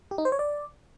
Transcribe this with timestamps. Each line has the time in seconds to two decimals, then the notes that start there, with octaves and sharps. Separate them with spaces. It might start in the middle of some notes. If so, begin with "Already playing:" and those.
0.11 G4
0.18 D#4
0.25 C5
0.32 C#5
0.39 D5